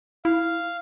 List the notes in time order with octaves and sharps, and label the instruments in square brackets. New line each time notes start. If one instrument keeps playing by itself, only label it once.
[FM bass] E4 [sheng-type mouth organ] F5